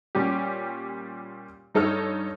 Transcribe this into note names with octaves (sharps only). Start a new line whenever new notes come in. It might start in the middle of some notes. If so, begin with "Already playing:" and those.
A#2 G3 C#4 G4
G2 D#4 A4 C#5 F6